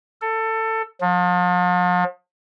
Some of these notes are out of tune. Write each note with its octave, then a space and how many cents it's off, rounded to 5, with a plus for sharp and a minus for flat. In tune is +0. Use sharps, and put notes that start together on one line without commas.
A4 +20
F3 +40